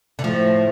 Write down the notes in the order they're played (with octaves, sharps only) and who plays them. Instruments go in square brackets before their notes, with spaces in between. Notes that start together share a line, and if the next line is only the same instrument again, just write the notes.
[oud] D3
[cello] A2 [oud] F3